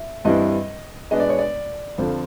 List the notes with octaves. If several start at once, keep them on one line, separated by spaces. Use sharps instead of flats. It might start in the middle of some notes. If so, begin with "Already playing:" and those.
Already playing: E5
G2 E3 G3 C4 E4 D#5
B2 G#3 B3 D4 D#5
D5
C#5
D5
F2 D3 F3 C5